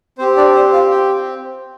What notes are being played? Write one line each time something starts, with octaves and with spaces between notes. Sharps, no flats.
C4 G4 C5
D4 D5
C5
F4 F5
G4 G5